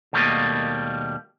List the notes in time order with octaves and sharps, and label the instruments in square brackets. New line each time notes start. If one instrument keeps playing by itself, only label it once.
[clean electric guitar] D#2 B2 G3 A3 A#3 D#5